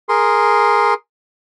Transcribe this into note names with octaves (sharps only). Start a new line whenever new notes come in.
G#4 A#4 C6